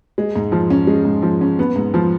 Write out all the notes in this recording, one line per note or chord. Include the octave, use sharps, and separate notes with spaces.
G#3
G#2
F3
C#4
G#3
G#2
F3
C#4
B3
G#2
F3